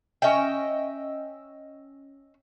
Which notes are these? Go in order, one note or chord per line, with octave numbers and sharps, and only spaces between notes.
C#4 D#5 E5 G5